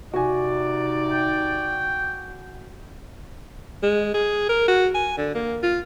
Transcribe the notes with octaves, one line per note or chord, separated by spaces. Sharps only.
C3 D#4 F#4 D5 G#5
G5
G#3
G#4
A#4
F#4
G#5
D3
A#3
F4